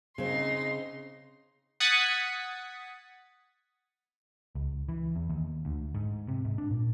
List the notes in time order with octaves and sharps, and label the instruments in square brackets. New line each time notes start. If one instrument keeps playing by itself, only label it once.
[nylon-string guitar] C#3 C4 [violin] D#4 C6
[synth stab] F#5 D#6 G#6 A6 B6 C#7
[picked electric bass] C#2
E3
E2
D#2
D2
G#2
C3
G#2
D4
A#2